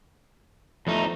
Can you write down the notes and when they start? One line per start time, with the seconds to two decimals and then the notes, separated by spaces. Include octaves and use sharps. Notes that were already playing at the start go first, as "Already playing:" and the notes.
0.87 E2 F3 A3 D#4